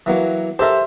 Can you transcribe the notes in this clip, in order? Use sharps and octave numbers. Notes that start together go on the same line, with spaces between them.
E3 F#3 A#3
G4 A4 A#4 C5 E5